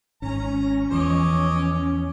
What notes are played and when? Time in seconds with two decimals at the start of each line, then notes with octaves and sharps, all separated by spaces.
0.22 G#1 G#2 C#4 A#5
0.91 E2 E3 F3 C#5 D#5 D6